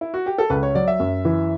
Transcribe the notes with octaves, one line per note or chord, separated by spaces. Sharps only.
E4
F#4
G4
A4
C#2 B4
C#5
F#3 D5
E5
F#2
E3